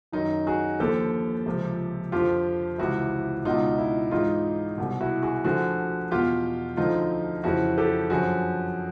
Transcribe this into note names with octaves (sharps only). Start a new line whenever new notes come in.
F#2 D#3 D#4
F#4 G#4
D#2 D3 F3 G4 A4
C#2 C3 F3
F2 D3 F3 F4 G4
C#2 C3 E3 E4 F#4
C#2 B2 D#4 F4
E4
G#2 E3 D#4 F4
C2 B2
E4 F#4
F#4 G#4
D2 D3 F3 F#4 G#4
E2 B2 F4 G4
D2 D3 F3 D#4 F4
F2 C#3 E3 E4 F#4
G4 A4
F#2 D3 F3 F#4 G#4